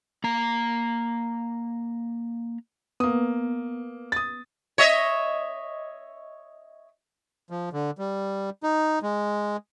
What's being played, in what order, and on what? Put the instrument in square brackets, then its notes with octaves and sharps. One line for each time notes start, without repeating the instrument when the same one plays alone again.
[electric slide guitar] A#3 A#5
[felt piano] A#3 D#6 [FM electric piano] B3
[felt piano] D#6 A6
[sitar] C#5 D#5 E5
[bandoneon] F3
D3
G3
D#4
G#3